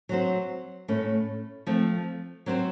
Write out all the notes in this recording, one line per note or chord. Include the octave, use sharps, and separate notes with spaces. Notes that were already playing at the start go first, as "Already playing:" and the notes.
F#3 C4 F#4 C5
A2 A3 C#4
F3 A3 C4
F#3 C4 F#4 C5